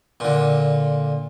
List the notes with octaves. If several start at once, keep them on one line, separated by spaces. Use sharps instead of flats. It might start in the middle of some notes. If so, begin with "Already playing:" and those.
A#2 D3